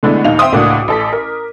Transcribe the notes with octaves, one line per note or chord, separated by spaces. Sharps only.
D3 G#3 A3 B3 D4 E4
A#1 D#2 D#4 F5 F7
C4 E5 G5 C6 D#6
C#2 A2 A#3 D4 F#4 D6
A1 A4 B6
A#4